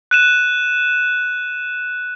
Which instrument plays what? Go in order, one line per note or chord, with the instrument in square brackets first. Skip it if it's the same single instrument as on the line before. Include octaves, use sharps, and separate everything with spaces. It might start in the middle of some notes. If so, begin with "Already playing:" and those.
[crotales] F#6 D#7 E7